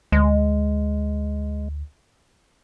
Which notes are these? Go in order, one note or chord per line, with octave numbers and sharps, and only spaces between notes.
D2 G#3